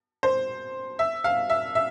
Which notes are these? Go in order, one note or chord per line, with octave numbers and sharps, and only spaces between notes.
C5
E5
F5
E5
E5